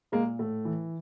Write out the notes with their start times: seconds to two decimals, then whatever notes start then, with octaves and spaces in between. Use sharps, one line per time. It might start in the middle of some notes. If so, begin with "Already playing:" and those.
0.12 A#2 G#3 A#3
0.39 A2 A3
0.65 E3